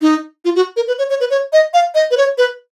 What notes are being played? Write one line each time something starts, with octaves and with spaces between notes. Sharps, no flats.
D#4
F4
F#4
A#4
B4
C#5
C#5
B4
C#5
D#5
F5
D#5
B4
C#5
B4